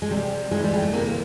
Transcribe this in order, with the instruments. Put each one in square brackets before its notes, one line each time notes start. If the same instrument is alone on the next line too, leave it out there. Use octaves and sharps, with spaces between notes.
[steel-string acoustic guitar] G#3
[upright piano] C3 [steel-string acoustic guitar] G3
[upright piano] E3 [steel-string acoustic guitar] G#3
[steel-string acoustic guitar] G3
G#3
A3
[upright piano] C3 [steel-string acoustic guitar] A#3
[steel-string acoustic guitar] A#3